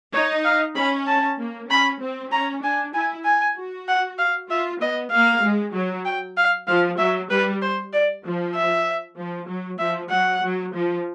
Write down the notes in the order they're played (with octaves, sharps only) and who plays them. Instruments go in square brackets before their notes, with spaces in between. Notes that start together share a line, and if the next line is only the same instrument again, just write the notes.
[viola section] D#4 [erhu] C#5
[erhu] F5
[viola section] C#4 [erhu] B5
[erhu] A5
[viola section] A#3
[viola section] C#4 [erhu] B5
[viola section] C4
[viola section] C#4 [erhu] A#5
[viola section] D4 [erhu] G#5
[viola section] E4 [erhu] G#5
[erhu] G#5
[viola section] F#4
[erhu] F#5
F5
[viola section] F4 [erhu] E5
[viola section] B3 [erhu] D#5
[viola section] A#3 [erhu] F5
[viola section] G#3
F#3
[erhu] G5
F5
[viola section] F3 [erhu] F5
[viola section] F#3 [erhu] E5
[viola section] G3 [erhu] B4
[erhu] C5
D5
[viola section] F3
[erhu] E5
[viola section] F3
F#3
[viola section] F3 [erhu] E5
[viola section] F#3 [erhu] F#5
[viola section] F#3
F3